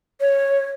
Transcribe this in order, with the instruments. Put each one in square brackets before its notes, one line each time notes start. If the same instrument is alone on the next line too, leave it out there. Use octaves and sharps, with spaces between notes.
[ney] C#5